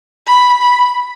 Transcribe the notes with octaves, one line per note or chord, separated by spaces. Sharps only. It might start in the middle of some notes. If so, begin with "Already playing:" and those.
B5
B5